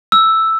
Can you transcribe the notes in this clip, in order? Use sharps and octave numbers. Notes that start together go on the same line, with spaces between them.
E6